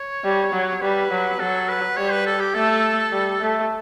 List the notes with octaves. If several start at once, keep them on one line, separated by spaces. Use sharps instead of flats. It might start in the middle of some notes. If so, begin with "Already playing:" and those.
Already playing: C#5
G3
F#3
G3 B4
F#3
F#3 A4
B4
G3 C#5
B4
A4
G4
A3 A4
G3
A3